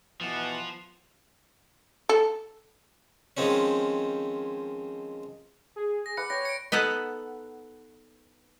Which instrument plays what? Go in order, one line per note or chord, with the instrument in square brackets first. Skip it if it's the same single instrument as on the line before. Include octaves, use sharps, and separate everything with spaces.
[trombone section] B2 E3 B3 [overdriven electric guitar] F3 [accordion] F#5 A5
[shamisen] A4
[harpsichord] D#3 F3 G#3 C4 C#4
[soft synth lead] G#4
[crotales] A#6
[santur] B4 F#5 D6 [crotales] C#7
[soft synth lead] C#5 [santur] G5 [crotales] A#6
[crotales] C#7 D7
[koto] B3 D#4 A4 F#5